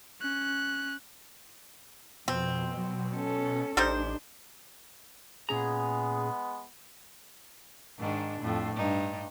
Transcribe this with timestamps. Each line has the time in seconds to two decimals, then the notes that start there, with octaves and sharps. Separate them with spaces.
0.21 C#4 F#6
2.28 F2 B2 C4
2.77 F#3
3.15 C#4 A4
3.77 A1 G3 D4 D#4 C5
5.49 A#2 G#3 B3 C#4 G#4 A#5
7.99 G#2 D#3 D4
8.41 F2 A2
8.76 G2 D#4